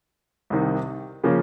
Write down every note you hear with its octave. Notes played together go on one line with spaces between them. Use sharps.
C2 C3 D#3
C#3 F3 A#3 C#4